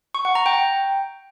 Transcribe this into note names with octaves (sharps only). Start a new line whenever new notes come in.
C#6
F#5
A#5
G5